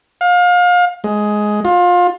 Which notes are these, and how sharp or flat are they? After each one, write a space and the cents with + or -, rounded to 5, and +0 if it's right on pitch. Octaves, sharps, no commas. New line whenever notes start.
F5 +30
G#3 +10
F4 +25